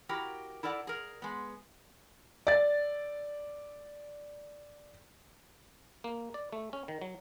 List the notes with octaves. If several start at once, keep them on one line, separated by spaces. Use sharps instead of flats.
E4 F#4 G4 A#4
E4 A4 A#4 D5 F#5
G#4 A#4
G#3 B3
D5 A6
A#3
D5
A3
C#4
D#3
F#3